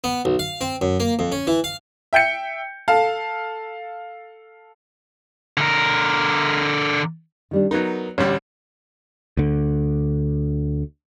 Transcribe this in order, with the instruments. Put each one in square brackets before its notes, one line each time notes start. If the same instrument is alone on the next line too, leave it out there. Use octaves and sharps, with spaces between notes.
[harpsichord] B3
B1
F5
C4
F#2
A#3
F2
C#4
E3
F5
[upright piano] E5 G5 G6 C#7
A4 F5 A5
[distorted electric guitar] D3 A#4
[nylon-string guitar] D#3 G3 D4
[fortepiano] F#3 B3 D#4 [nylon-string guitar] A#4
[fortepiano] A1 D2 G3 [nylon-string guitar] C#5
[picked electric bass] D2 D3